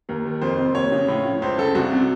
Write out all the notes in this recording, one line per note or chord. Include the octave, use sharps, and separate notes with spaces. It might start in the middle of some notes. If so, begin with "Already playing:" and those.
D#2 A#4
D#3
F2 C5
C3
D#2 C#5
C#3
A2
F3
C#2 C5
C#3 A4
C2 F#4
C3